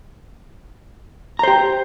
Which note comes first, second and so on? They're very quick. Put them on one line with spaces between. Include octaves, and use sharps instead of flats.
A#5 C5 G4